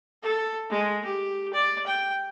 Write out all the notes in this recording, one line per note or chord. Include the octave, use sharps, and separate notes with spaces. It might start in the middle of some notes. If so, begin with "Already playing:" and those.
A4
G#3
G4
D5
G5